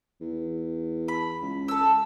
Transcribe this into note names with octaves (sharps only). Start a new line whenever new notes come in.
E2
B5
C#2
A4 E6